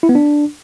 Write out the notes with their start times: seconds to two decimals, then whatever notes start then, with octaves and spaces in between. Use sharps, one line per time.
0.03 E4
0.09 B3
0.15 D4